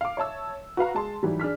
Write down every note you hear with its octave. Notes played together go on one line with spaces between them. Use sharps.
F5 D6
C#5 E5 A5 E6
F#4 B4 F5 A#5
G#3 A5 C6
G#2 E3 F#3 G3
D4 G#4 F6 B6